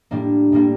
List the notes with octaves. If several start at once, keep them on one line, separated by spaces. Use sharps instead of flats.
A2 G3 A#3 D4
A2 G3 A#3 D4